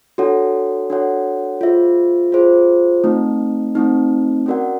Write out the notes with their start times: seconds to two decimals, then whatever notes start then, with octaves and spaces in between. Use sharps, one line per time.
0.18 D4 F#4 A4 C#5 F#5
0.90 D4 F#4 A4 C#5 F#5
1.61 F4 G#4 C5 E5
2.32 F4 G#4 C5 E5
3.04 A3 C4 D#4
3.75 A3 C4 D#4
4.46 C#4 F#4 A#4 D5 F#5